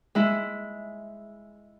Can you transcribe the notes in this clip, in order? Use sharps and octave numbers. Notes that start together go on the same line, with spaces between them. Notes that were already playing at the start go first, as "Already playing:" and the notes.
G#3 E4